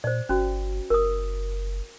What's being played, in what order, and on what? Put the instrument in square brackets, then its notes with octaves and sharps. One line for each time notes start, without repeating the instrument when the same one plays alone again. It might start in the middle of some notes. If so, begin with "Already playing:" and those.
[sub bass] A#2 [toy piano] C5 D5
[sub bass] G1 [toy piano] C#4 F#4
[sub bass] F#1 [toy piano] A#4 D#6